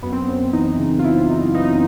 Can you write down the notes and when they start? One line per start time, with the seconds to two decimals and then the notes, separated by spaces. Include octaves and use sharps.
0.02 F#2 B3
0.12 C4
0.22 B3
0.28 F#2
0.53 E3 D#4
0.78 C#3
0.99 F4
1.04 F#2 E4
1.29 F#2 D#4
1.54 E3 D#4